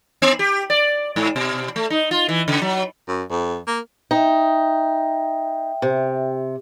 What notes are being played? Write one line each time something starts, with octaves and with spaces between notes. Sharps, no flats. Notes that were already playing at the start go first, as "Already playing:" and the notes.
B3
G4
D5
G#2
B2
A3
D#4
F4
E3
C#3
F#3
F#2
F2
A#3
D#4 E5 G5
C3